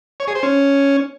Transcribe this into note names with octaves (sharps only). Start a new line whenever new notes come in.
C#5
G#4
C5
C#4